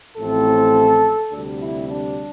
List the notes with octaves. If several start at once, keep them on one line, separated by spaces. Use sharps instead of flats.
A1 A2 F3 A3 C4 A4
D2 C3 G3 D4
E4
D4